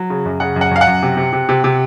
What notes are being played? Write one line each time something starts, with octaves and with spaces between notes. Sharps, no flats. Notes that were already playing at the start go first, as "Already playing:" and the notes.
Already playing: F#3
C#3
F#2
C#3 F#5
F#2
F#5
F#2 F5
F#5
F#2
C3
C3
C3
C3
C3